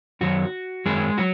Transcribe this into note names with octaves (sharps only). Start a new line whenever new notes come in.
F#2 D#3 F#3 F#4
F#2 D#3 F#3 G#3 G#4
F#3 F#4